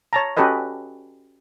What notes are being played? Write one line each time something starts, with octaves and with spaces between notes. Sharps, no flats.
C#5 A5 A#5
C#4 F#4 G4 A4 B4 D#5